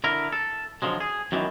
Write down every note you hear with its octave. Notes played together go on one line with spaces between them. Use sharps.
D3 E4 A#4
A4
D3 F3 F#3 G#3
G#4
F#2 D#3 E3 B3